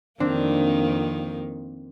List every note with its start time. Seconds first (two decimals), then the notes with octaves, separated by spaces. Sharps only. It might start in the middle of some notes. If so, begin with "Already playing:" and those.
0.20 F2 D#3 A#3 C4 D4